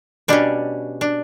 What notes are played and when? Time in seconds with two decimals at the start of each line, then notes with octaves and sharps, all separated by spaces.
0.28 B2 G3 C#4 D4
1.01 D4